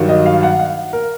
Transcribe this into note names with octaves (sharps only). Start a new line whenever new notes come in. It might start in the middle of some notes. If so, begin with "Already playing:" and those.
Already playing: G2 D#3 F#3
D#5
F5
F#5
F5
A#4